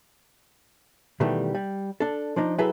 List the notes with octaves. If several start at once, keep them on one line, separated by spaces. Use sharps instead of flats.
B2 D#3 E3 G3 A3
G3
D4 A4
F3 D4 D#4
F#3 E4 G#4 A4 B4 E5